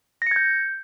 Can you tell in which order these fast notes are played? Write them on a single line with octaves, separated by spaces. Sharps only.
A#6 C#7 G#6 G6